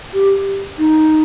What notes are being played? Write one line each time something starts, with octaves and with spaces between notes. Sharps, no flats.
G4
D#4